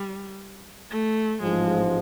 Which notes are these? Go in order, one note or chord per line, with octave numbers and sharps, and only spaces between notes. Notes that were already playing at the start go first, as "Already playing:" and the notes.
Already playing: G3
A3
A1 G#2 F3 G#3